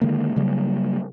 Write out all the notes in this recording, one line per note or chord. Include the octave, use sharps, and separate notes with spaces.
D3 D#3 G#3 A#3
C#3 F#3 G3 A#3